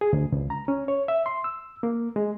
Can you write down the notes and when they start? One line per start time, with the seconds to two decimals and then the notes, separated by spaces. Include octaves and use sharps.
0.01 G#4
0.13 D2
0.32 C#2
0.50 A#5
0.68 C#4
0.88 C#5
1.08 E5
1.26 C6
1.44 E6
1.83 A#3
2.16 G#3